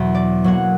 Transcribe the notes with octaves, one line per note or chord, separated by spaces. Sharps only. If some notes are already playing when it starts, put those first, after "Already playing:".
Already playing: E2 B2 F#3
D5
B2 F#3 A#3 F#5